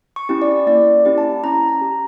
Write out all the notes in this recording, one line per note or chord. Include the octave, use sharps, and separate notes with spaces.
C#6
C#4 E4 G4
D5
A#3 D5
C#4 E4 G4
A5
C#4 A#5
A#5
G4